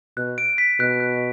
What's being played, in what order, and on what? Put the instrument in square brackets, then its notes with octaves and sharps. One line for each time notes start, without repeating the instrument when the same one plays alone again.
[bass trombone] B2 [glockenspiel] F#6
[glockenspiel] D7
B6
[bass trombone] B2 [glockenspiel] F#6
[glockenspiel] F#6